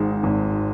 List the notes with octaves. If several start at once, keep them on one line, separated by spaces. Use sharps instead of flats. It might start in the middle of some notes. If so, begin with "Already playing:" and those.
Already playing: G#1 G#2 D#3 G#3
G#1